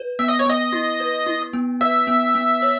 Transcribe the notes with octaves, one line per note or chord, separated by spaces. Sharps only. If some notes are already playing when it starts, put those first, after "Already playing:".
Already playing: B4
B3 E5
D#5
C#5
B3 D#5
E4
B4
E4
B3
B4 E5
B3
B3
C#5